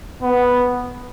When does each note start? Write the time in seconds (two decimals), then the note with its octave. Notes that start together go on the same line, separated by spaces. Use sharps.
0.22 B3